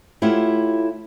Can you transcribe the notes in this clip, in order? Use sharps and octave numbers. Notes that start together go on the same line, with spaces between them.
A3 E4 F4 G4 C#5 F#5